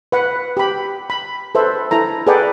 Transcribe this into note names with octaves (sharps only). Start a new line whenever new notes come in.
B4 F#5
G4 B5
B5
A4 B4 C5 E5
E4 A4 A#5
G#4 A4 B4 D5 F#5 G5